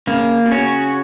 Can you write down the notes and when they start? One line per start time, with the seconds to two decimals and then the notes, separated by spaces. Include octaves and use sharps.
0.07 C#3 A#3
0.46 B2
0.51 C#3 C#4 F#4 C#5